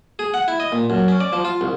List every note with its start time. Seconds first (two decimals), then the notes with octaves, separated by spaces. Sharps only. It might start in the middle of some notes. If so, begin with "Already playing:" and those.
0.19 G#4
0.34 F#5
0.48 E4
0.60 D#5
0.72 A#2
0.90 F#2
1.08 C#4
1.20 D5
1.33 F3
1.45 F4
1.61 C2